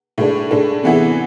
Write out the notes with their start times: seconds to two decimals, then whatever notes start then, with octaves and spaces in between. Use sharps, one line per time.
0.18 A2 G#3 D4
0.51 A2 G#3 D4
0.83 C3 E3 B3 E4 G#4